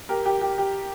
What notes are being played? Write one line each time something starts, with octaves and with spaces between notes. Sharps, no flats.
G4 A#4
G4
G4
G4